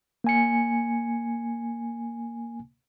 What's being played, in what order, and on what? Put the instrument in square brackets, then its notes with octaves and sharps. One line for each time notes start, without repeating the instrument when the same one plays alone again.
[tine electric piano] A#3 G#5 C#7